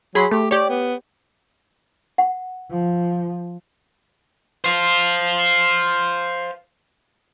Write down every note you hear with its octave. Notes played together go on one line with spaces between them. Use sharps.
F#3 G#4 B5 C6
A3 G4
G4 C#5 D5
B3
F#5
F3
C5 F5